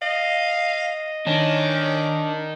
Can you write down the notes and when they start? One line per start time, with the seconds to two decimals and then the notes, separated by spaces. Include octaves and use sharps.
0.02 D#5 F5
1.27 D#3 C#4 D4